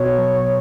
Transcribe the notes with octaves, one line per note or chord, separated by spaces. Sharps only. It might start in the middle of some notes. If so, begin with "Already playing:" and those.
Already playing: B2 C#5
F#3